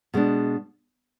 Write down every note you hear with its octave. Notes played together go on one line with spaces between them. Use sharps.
B2 G#3 D4